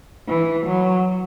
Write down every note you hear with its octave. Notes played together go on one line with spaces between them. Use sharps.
E3
F#3